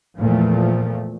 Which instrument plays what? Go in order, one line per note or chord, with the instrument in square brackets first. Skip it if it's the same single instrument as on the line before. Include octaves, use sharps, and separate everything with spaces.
[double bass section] E2 A#2 F3 A3